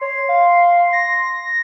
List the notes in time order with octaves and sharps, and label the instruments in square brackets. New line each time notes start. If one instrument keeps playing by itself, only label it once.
[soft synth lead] C#5 [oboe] C6
[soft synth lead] F5
A#6